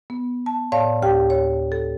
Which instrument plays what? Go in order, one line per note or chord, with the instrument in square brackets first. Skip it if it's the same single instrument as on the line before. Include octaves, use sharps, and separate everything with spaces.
[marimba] B3
A5
A2 C#5 D5 F5 A5
D2 G4 G5
C#5
A4